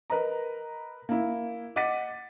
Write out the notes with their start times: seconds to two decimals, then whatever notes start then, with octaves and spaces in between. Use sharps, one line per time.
0.10 A#4 B4 D#5 A#5
1.09 A#3 E4
1.76 D#5 F#5 D6 A6 B6 D#7